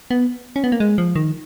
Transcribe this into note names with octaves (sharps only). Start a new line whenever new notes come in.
B3
C#4
B3
A#3
G#3
F3
D#3